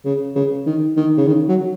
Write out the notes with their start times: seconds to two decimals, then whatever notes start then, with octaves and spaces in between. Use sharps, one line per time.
0.05 C#3
0.35 C#3
0.67 D#3
0.97 D#3
1.18 C#3
1.27 D#3
1.49 F#3